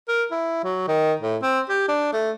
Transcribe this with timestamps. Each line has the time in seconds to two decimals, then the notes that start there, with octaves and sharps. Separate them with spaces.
0.08 A#4
0.31 E4
0.64 F#3
0.88 D#3
1.21 A2
1.42 C4
1.69 G4
1.88 D4
2.13 A3